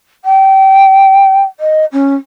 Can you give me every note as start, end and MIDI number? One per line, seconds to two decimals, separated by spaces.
0.24 1.41 79
1.60 1.85 75
1.92 2.14 61